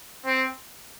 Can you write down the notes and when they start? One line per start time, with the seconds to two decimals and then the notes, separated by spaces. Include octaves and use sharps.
0.26 C4